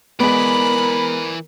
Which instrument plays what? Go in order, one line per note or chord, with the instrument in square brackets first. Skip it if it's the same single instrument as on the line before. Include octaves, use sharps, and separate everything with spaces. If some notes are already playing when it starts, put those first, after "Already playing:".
[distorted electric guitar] E3 D5 [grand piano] G#3 B3 [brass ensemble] A#4 [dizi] B5